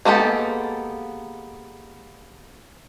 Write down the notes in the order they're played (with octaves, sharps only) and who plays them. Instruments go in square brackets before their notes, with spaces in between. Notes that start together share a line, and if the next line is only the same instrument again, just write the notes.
[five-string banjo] G#3 A#3 B3 G4 A4